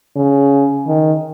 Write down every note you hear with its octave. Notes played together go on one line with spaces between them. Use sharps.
C#3
D#3